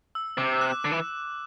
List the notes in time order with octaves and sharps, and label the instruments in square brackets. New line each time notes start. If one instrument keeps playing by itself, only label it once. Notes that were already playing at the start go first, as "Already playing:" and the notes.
[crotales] E6
[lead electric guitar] C3 [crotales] D6
[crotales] F#6
[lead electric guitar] D3 [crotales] F#6
[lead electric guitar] E3